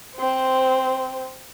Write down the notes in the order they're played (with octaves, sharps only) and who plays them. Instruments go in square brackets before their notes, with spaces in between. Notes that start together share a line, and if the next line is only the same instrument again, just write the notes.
[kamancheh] C4 C5